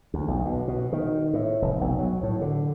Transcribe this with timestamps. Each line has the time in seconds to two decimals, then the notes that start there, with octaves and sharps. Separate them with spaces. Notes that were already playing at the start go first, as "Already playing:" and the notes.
0.14 D2
0.28 B1
0.45 B2
0.68 B2
0.93 D#3
1.33 A2
1.62 F1
1.81 B1
1.99 F#3
2.23 A2
2.42 D3